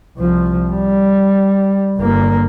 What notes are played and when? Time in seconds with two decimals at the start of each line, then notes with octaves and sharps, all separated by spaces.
0.17 C2 F3
0.70 G3
1.97 G1 A#3